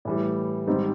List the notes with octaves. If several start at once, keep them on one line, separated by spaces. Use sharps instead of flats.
A2 E3 G3
G#2 D#3 G3 C4